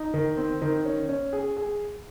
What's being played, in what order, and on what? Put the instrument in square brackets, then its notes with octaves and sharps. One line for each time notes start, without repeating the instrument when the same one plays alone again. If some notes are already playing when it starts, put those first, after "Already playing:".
Already playing: [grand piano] D#4
D#3
C4
D#3
C#4
C#4
G#4
G#4